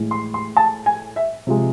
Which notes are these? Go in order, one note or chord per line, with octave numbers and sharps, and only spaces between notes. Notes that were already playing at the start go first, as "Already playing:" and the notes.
Already playing: A2 E3 G#3
C6
C6
A5
G#5
E5
C3 F3 G#3